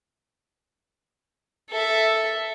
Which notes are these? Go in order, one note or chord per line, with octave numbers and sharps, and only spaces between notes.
A4 E5